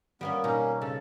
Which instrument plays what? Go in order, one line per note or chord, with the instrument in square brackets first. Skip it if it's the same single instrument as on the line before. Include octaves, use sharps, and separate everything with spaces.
[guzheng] G3 A#3 C#4 [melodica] B3
[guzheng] B2 D#4 [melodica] A#3 C#4
[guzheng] C#3 [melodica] A4